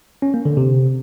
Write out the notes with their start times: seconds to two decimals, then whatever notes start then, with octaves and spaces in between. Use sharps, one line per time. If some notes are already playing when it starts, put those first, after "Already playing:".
0.22 C#4
0.34 A#3
0.45 D3
0.57 C3